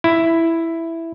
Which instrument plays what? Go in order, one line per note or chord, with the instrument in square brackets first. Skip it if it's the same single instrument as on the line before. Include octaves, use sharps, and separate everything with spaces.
[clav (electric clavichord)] E4